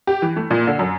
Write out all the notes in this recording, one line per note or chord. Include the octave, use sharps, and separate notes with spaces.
G4
E3
A3
A#2
D3
F#2